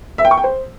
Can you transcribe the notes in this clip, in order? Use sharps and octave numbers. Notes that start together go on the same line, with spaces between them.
E5
G5
C#6
G5
C5